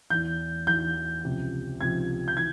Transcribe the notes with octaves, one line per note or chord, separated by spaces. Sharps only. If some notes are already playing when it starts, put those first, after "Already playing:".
E2 E3 G6
E2 E3 G6
C#2 C3 F3
C#2 C3 F3 G#6
G6
E3 G#6